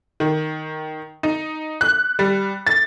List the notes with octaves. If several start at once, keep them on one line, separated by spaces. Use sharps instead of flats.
D#3
D#4
F#6
G3
A6